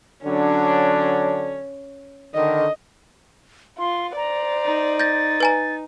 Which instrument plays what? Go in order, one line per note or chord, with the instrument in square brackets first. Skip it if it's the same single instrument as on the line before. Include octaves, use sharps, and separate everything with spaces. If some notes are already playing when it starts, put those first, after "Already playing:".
[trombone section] D3 F#3 D4 [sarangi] C#4
[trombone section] D3 D#3 [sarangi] D#5
[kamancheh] F4 [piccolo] C6
[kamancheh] C5 D5 [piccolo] A#5
[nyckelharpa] D#4
[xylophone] G6 A#6 [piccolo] A6
[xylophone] B4 G#5 A#5